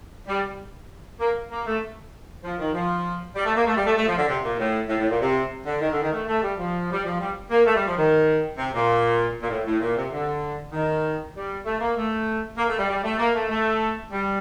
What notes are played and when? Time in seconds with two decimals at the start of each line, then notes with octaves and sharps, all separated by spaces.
0.28 G3
1.20 A#3
1.51 A#3
1.67 A3
2.44 F3
2.59 D#3
2.74 F3
3.36 G3
3.46 A3
3.56 A#3
3.67 A3
3.77 G3
3.87 A3
3.97 A3
4.08 F3
4.17 D3
4.28 C3
4.44 A#2
4.59 A2
4.89 A2
5.00 A2
5.10 A#2
5.21 C3
5.66 D3
5.81 D#3
5.92 D3
6.02 D#3
6.13 A3
6.27 A3
6.42 G3
6.59 F3
6.92 G3
7.05 F3
7.20 G3
7.51 A#3
7.66 A3
7.76 G3
7.87 F3
7.97 D#3
8.58 C3
8.74 A#2
9.42 A#2
9.50 A2
9.66 A2
9.81 A#2
9.96 C3
10.12 D3
10.73 D#3
11.35 G3
11.65 A3
11.80 A#3
11.97 A3
12.58 A#3
12.68 A3
12.78 G3
12.88 G3
13.04 A3
13.19 A#3
13.35 A3
13.49 A3
14.11 G3